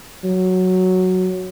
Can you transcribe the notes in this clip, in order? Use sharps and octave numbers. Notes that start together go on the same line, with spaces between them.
F#3